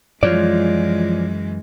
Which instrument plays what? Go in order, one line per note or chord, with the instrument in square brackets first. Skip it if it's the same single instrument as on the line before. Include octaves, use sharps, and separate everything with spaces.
[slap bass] F#2 [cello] E3 G#3 [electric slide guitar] F3 [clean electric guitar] F4 C#5 D5